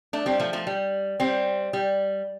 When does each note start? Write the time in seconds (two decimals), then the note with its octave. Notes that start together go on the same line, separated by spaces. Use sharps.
0.13 A3 D4
0.26 G3 C4
0.40 F3 A3
0.53 F3 A3
0.67 G3
1.20 G3 C4
1.73 G3